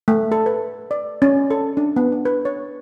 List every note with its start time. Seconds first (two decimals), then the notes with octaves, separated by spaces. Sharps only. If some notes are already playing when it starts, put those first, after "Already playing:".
0.08 A3
0.32 A4
0.46 B4
0.91 D5
1.22 C#4
1.51 A4
1.77 D4
1.96 B3
2.12 D4
2.25 B4
2.45 C#5